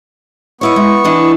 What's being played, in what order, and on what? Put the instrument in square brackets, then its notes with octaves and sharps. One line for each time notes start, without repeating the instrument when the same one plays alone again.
[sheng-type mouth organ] B3 C#6 [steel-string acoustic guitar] D#4 E4 C#5
[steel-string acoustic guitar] G#3
E3 D4 D#4